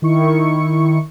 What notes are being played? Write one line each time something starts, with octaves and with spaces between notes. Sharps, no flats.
D#3 E4 C#6 C#7